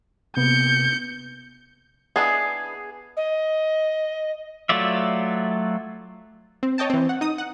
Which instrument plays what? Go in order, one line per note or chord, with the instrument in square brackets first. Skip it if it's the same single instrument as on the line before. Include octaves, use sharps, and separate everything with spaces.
[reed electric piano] C3 A#3 B3 [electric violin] G6 C#7
[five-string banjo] B3 D4 E4 [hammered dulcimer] G#4
[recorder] D#5
[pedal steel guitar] F#3 A3 F4 D5 E5
[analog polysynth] C4
C#5 D#5 G5 A5
E3 C4
F#5
D#4 D#6
F#5